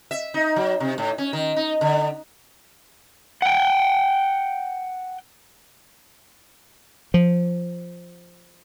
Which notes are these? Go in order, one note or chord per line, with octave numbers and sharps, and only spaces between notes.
E5
D#4
F#3
C3
A2
C#4
D#3
D#4
D3
F#5 G5
F3